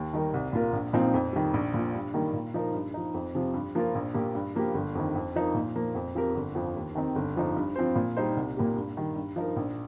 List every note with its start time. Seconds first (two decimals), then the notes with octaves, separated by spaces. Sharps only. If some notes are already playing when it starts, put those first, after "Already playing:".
Already playing: D#2
0.13 D#3 G3 D#4 A#4
0.34 C2
0.53 A#2 A#3 F4 A#4
0.73 A#1
0.93 A#2 F3 C4 D#4
1.14 F2
1.33 D#3 G3
1.54 A#1
1.74 A#2 F3
1.93 G2
2.14 D#3 G3 A#3
2.33 A#2
2.54 F3 D#4 A#4
2.74 G2
2.94 F3 D#4
3.14 F2
3.35 C3 F3
3.54 G2
3.75 F3 A#3 F4 A#4
3.95 A#1
4.14 A#2 A#3 G4
4.35 G2
4.55 F3 A#3 G4
4.74 G1
4.95 F2 D#3
5.16 F2
5.36 F3 D#4 A#4
5.55 A#2
5.75 F3 A#3
5.95 F2
6.15 F3 C4 G4 A#4
6.35 G1
6.55 F2 F3
6.76 D#2
6.95 D#3 C4 D#4
7.15 G1
7.36 F2 F3 D#4
7.56 G2
7.76 F3 C4 F4 C5
7.96 A#2
8.17 G3 D#4 C5
8.37 C2
8.57 A#2 A#3 G4
8.76 G2
8.97 D#3 G3
9.16 G2
9.36 F3 D#4 A#4
9.56 A#1